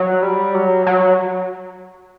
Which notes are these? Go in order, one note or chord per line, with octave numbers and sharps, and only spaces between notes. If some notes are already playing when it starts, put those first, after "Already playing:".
Already playing: F#3
G3
F#3
F#3